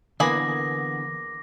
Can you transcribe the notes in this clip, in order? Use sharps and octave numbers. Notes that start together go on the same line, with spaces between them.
D3 E3 A#3 B3 G#4 B5 D6 A#6